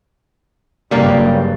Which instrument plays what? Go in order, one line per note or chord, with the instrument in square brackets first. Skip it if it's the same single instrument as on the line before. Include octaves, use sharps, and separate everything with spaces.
[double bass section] F#1 G2 C#3 [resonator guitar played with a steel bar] G3 A#3